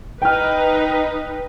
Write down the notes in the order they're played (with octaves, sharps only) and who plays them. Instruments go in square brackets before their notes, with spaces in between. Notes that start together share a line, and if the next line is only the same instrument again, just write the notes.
[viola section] D#4 B4 [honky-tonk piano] G5 F6